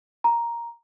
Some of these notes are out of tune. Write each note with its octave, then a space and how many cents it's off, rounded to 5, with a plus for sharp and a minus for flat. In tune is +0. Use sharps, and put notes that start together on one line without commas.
A#5 +5